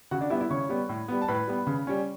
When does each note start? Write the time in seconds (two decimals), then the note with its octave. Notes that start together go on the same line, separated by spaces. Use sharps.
0.11 C#3 F#4 F#5
0.21 D4 D5
0.30 G3 B3 E4 E5
0.40 E4 E5
0.50 C#3 C#5 C#6
0.69 G3 B3
0.89 A2
1.08 G3 B3
1.22 A5
1.28 A2 B4 B5
1.48 G3 B3
1.67 C#3
1.87 G3 C#4